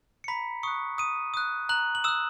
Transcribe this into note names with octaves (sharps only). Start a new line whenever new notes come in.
C#7
A#5 B5 B6
C#6 D#6 F#6 C#7
A#5 D#6 D#7
D#6 F#6
A#5 F#6 F#7
F#7
D#6 E6 F#6 E7